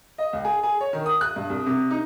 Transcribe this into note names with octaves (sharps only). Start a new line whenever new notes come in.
D#5
C#2
G#4
G#4
C#5
D#3
D#6
F#6
G2
C2
C3
D#4